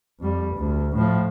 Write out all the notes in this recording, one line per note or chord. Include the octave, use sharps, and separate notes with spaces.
F2 G3
D2
A2 F3